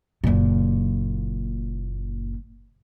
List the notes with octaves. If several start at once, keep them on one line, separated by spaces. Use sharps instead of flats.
F#1 A#2